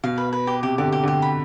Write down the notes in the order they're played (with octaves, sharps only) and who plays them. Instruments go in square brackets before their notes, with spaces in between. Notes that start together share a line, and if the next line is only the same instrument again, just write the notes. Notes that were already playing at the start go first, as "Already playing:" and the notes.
[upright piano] B2 [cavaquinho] F5
[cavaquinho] B4
B4
G4
[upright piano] C3 [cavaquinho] G4
[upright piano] D3 [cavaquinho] G4
[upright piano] C3
[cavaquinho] G4
[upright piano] D3 [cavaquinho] G4
[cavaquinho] B5